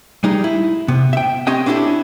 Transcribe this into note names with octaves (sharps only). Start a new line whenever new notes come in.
G3 G#3 D#4
E4
C3 B3
E5 G5
C4 C#4 G4 D#5 G5
C#4 D4 E4 F#4 G4 A4